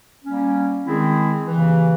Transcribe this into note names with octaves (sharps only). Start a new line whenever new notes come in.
G3 A#3 C#4
D#3 G#3 C4 E4 G#4
D#2 C#3 E3